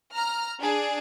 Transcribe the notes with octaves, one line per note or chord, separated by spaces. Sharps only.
A#5 F6
D4 G#4